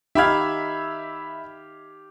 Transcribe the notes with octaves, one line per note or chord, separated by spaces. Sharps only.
D#4 G4 E5 F5 B5 G#6